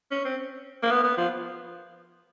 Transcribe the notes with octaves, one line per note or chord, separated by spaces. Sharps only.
C#4
C4
A#3
B3
B3
F3